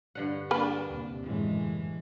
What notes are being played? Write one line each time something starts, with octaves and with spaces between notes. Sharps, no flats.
G2 D3 F#5
A#3 D4 B4
D#2 C3
F#1 A2 E3 G#3